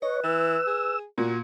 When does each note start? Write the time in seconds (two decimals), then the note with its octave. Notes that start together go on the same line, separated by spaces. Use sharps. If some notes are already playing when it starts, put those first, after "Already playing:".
0.02 B4 C#5 D#5
0.24 E3 E6
0.67 G#4
1.18 A#2 F#4